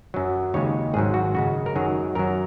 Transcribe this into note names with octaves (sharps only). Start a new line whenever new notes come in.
F#2 F#3
D#2 C#3 G#3 C#5
G#1 G#2 F#3 G#4
F#4
F#2 C#3 G#3 F#4
A#4
F#2 D#3 F#3 G#4
F#2 F#3 A#4